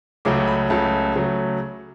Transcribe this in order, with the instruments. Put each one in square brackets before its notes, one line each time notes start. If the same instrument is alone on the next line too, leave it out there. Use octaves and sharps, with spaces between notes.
[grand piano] C#2 C#3 F#3 A3 D6
B5
C#2 C#3 F#3 A3 A5
C#3 F#3 A3